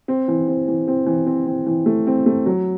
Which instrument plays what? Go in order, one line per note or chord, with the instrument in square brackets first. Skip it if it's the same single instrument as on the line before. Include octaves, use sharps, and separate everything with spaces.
[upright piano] C4
E3
C4
E3
C4
E3
C4
C4
E3
A3
C4
A3
F#3